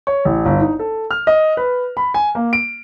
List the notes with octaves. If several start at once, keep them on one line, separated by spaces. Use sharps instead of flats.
C#5
A1
G1
D#4
A4
F6
D#5
B4
B5
G#5
A#3
D7